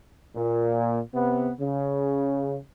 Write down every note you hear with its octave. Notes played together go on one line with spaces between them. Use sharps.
A#2
C3 B3
C#3